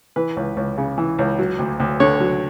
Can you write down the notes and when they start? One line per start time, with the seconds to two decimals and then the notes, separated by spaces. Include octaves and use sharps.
0.16 E3 B4
0.37 C#2
0.57 C#2
0.78 C#3
0.98 E3
1.19 C#2
1.39 F#3
1.59 D2
1.80 D2
2.00 D3 C#5
2.20 F#3